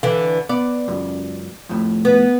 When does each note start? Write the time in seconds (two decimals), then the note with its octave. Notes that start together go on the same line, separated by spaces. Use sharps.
0.03 D3 E3 F5
0.49 B3 D5
0.88 C#2 F#2
1.69 F2 A2
2.05 B3